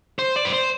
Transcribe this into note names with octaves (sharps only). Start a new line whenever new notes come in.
C5
D5
B4
C5